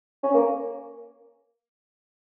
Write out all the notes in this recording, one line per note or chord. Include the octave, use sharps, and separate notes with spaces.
C#4
A#3